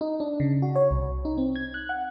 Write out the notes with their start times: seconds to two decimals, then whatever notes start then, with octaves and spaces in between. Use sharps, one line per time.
0.01 D#4
0.20 D4
0.40 C#3
0.62 F#4
0.76 C#5
0.91 C2
1.25 D#4
1.38 C4
1.56 G#6
1.74 F#6
1.89 F#5